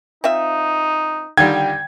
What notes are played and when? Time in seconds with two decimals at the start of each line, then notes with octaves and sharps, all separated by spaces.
0.24 C4 D#4 F4 E5
1.37 D3 D#3 G3 F4 G5 G#6